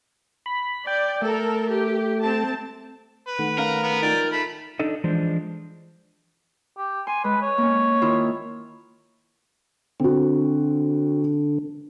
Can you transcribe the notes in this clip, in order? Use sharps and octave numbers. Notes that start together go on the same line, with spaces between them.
B5
D5 G5
A3 A4 A#4
G4
C4 A5
B4
D#3 A3 F#5
C#4 A#4 F5
B3 B4
D#4 F4 D5 G5
A3 B5
D4 D#4 A4 D#5
E3 F3 G#3 D4 C5
G4
G#5 C6
G#3 B4
C#5
A#3 C#4
D#3 E4 F4
D3 C4 F#4